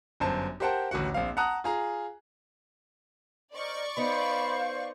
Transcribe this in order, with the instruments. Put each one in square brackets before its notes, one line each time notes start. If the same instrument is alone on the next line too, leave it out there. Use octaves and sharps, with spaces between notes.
[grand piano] G1 F#2 C5 A5
G4 A#4 C5 F#5 G5 A5
A1 D2 F#4 F#5
A#1 C4 F5
F#5 A5 A#5 D#6 F#6
F4 G#4 A#5
[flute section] A#4 C5 D#5 [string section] D5 C#6
[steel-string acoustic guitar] B3 D#4 [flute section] C5 F5 [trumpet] B5